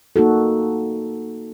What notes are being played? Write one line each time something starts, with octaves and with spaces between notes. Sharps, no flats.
A#3 D#4 F#4 A4